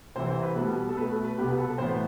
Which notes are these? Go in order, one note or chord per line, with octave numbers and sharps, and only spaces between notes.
C2 C3 E3 C5
C5
B4
B2 G3 B3 A4
A4
B2 A3 B4
A4
B4
C2 B2 B3 G4
B4
A4
A2 E3 B3 C5